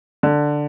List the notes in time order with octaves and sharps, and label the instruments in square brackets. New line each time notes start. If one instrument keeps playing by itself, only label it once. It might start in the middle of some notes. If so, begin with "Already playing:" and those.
[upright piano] D3